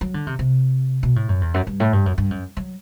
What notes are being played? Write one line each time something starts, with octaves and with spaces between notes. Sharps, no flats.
F#3
D3
C3
C3
B2
A2
F#2
E2
F#2
G2
A2
G2
F#2
G2
F#2
F#3